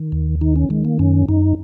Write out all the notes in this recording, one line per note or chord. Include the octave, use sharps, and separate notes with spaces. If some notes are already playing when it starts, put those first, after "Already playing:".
Already playing: D#3
D#2
D#3 D#4
C#4
D#3 G#3
A#3
F#2 C#4
F#2 D#4